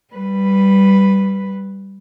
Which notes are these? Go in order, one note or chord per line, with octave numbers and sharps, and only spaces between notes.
G3 B4